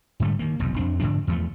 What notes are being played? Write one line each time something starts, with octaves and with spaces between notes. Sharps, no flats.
G#2 D3 G3 A3
D#3 A#3
F1 B1 E2
F2 C4 D4
G#2 D3 F3 D4
E2 F3 A3